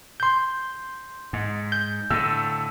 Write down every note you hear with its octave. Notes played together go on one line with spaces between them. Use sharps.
C6 G6
G#2
G6
A2 D3 E6